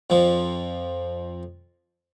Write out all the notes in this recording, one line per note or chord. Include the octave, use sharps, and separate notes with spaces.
F2 F3